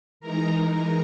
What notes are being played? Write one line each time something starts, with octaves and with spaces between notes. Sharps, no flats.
E3 G#3 D#4 A#4 A#5